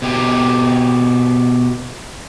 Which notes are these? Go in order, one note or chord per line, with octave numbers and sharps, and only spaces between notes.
B2 G4